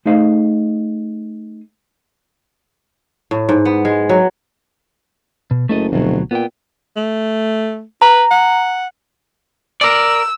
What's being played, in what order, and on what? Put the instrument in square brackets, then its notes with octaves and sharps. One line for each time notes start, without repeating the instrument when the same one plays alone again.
[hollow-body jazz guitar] A3 D#4 G#4 C5 D#5 F5
[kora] A2
G#2
B3
G#3
F#3
[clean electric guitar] B2
[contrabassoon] F#1 [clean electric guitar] A3 A4 D#5
[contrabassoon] F1 [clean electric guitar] D2 B2 F#3
[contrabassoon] A#2 [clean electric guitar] B3 G5
[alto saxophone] A3
[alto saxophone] B4 [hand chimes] A#5
[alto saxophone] F#5
[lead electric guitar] A#4 D5 [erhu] E6